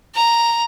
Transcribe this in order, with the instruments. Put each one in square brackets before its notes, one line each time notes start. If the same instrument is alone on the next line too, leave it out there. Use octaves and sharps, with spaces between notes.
[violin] A#5